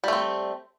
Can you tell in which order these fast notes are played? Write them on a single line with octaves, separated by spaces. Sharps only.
G3 A3 C4